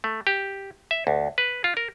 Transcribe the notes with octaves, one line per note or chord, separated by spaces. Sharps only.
A3
G4
E5
D2
B4
F4
A#4